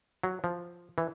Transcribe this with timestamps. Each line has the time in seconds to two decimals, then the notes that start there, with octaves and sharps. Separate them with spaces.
0.23 F#3
0.44 F3
0.98 E3